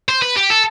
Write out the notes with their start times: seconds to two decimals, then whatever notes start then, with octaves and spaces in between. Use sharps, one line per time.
0.08 C5
0.22 B4
0.36 G4
0.50 A4